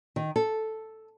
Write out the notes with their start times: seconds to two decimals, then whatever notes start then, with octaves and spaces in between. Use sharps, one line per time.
0.16 D#3
0.36 A4